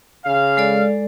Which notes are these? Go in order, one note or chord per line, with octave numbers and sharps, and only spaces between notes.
C#3 F5
G#3 A4 D5